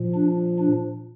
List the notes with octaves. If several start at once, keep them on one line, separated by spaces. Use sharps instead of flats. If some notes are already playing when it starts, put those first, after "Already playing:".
Already playing: A#2 F3
D4
D4